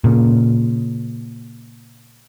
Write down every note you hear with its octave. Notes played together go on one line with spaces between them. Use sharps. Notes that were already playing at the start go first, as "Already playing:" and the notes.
A#2 C#3